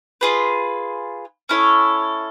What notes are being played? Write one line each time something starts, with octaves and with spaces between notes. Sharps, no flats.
F4 G#4 B4
C#4 E4 A4 C#5